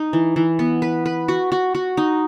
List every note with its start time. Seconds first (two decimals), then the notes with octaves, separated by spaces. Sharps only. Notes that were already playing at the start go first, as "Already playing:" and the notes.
Already playing: D#4
0.13 E3
0.36 E3
0.59 B3
0.82 B4
1.06 B4
1.28 F#4
1.52 F#4
1.75 F#4
1.97 D#4